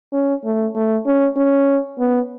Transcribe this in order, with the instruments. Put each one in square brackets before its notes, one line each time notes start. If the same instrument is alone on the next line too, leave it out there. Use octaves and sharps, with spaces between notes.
[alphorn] C#4
A3
A3
C#4
C#4
B3